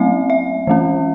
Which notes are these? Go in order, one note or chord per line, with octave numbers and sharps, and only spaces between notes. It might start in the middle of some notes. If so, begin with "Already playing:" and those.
Already playing: F#3 A3 C4 E5
E5
E3 A3 C#4